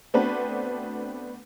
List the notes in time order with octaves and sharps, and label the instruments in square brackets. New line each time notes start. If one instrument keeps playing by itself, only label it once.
[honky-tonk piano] A3 B3 C4 D4 F#4 B4